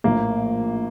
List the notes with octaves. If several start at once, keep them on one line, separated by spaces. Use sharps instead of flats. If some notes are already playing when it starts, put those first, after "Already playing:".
A#1 A2 A#3